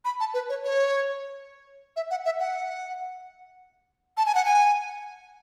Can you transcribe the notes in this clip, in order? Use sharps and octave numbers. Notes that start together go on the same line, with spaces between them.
B5
A5
B4
C#5
C#5
E5
F#5
E5
F#5
A5
G#5
F#5
G#5